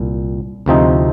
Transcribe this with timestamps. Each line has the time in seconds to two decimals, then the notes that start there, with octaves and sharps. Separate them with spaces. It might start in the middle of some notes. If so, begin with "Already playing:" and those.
Already playing: C2 A#2
0.66 D2 C3 F3 C4 D#4